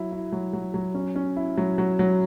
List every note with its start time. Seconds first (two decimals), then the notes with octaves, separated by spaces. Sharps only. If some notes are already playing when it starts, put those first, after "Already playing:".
Already playing: F#3 E4
0.12 E4
0.32 F#3
0.53 F#3
0.74 F#3
0.95 C#4
1.16 C#4
1.36 E4
1.58 F#3
1.78 F#3
1.99 F#3